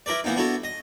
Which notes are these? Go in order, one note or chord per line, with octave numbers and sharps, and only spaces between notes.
E4 A#4 B4 D5
E3 A#3 B3 D#4
B3 D4 E4 F#4 A4
D#5